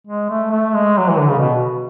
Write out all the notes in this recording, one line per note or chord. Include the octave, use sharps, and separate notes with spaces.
G#3
A3
A3
G#3
F#3
E3
D3
C#3
B2